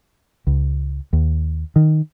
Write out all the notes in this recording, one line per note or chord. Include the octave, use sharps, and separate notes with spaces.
C#2
D#2
D#3